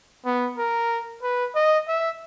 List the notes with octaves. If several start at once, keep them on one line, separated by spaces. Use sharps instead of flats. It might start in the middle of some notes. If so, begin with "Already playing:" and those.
B3
A#4
B4
D#5
E5